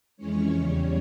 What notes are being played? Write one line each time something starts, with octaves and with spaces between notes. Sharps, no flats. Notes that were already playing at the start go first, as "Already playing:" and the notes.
F2 E3 G#3 C#4 C#5
E2 C#3 G3